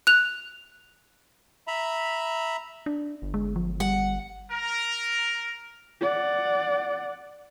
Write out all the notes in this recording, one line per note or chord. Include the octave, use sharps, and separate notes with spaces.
F#6 F7
E5 A#5 B5
D4
G1
G#3
F3
G3 F#5
A#4
D5 F#5